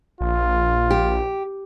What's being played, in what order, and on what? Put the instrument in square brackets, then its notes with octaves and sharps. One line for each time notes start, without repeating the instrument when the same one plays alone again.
[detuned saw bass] A#1 [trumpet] F4
[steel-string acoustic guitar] G4